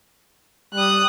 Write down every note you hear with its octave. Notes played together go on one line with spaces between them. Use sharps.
G3 D#6 F#6